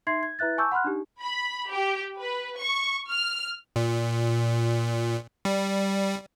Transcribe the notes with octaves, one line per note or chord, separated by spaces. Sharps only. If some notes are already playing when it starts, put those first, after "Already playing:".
D#4 E5 C6 G#6 C7
G#6
E4 B4 E5 F#6 A6
G#5 A5 C#6 D6 E6 G6
F#5 B5 C6 F6 F#6
D4 D#4 G4
B5
G4
B4
C#6
F6
A#2
G3